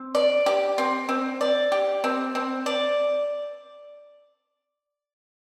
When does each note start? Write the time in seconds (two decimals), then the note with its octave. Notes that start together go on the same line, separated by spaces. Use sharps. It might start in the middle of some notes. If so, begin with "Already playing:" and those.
Already playing: C4
0.15 D5
0.46 G4
0.78 C4
1.09 C4
1.41 D5
1.72 G4
2.04 C4
2.35 C4
2.66 D5